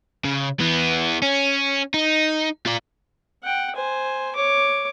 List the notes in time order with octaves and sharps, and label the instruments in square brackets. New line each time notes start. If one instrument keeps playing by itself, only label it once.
[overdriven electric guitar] C#3
E3 B3
C#4
D#4
F4 D5
[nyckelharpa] F#5 G5
C5 G#5
C#5 D6